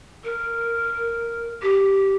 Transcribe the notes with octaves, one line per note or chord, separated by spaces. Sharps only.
A#4
G4